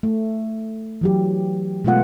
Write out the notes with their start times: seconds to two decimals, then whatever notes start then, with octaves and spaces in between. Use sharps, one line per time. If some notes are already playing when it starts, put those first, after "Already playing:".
0.03 A3
1.01 E3 F#3 G4
1.84 B2 G#3 A3 B3 F4 F#5